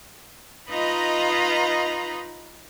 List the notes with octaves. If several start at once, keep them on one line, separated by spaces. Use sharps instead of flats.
D#4 F4 B4 D#5 A#5 B5